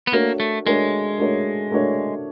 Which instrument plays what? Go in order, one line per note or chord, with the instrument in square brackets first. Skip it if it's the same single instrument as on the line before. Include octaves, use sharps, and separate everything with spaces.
[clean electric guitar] B3
[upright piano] A3 D4 F#4 A#4 C#5 [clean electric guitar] A#3
[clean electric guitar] A3
[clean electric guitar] G#3 [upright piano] A3 D4 F#4 A#4 C#5
[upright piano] A3 D4 F#4 A#4 C#5
A3 D4 F#4 A#4 C#5